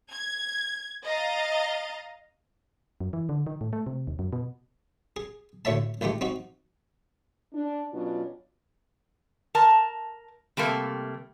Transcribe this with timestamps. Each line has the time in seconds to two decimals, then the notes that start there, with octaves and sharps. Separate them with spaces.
0.11 G#6
1.05 D#5 F5 A#5 A6
3.00 F#2
3.13 E3
3.29 D3
3.47 D#3
3.61 A2
3.73 A3
3.87 C3
4.07 D#2
4.19 F#2
4.33 B2
5.16 G#4
5.65 D2 A2 C#5 E5 A5
6.01 A#1 D#3 G#3 A3 G4
6.21 C4 D#4 F#4
7.53 D4
7.93 B2 F#3 C#4 D4 F4
9.55 A#4 A5
10.57 C3 G3 A3 A#3